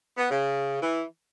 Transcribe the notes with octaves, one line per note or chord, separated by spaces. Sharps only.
B3
C#3
E3